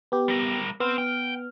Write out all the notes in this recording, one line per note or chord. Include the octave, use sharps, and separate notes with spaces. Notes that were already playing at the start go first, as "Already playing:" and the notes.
B3 G4
G3 A#4
B3 C4 F6
G5